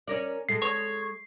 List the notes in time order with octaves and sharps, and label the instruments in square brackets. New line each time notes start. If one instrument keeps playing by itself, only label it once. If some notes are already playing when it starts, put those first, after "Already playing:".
[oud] C#4 A#4 D5
[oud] G#3 A4 [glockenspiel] C7
[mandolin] C#5